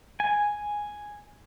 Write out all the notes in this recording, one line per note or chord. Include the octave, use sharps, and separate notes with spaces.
G#5